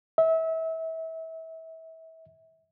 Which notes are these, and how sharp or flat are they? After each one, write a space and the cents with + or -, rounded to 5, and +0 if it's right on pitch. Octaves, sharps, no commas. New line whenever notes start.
E5 -30